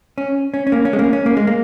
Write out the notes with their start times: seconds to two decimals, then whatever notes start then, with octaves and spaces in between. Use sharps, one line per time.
0.18 C#4
0.54 C#4
0.67 C#4
0.72 A#3
0.85 C#4
0.93 G#3
0.99 A#3
1.13 C#4
1.26 A#3
1.37 G#3
1.47 A#3